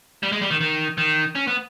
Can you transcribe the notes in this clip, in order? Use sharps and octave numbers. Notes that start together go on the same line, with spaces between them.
G3
G#3
G3
D#3
D#3
D#3
C#4
B3